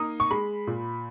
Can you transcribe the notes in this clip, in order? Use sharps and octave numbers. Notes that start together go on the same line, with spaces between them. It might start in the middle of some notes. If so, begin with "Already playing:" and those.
Already playing: A#3 D#4 D#6
C#6
G#3 B5
A#2